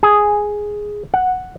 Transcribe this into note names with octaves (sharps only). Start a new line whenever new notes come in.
G#4
F#5